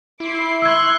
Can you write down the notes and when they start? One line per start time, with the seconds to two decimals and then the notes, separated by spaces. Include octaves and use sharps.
0.20 E4 C6 D6 C7
0.62 C6 C#6 E6 F#6 G#6